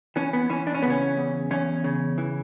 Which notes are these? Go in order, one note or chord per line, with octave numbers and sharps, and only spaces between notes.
E3 C#4
B3
E3 C#4
D4
C#4
C#3 B3
C#4
E2
E2 C#4
C#3
E3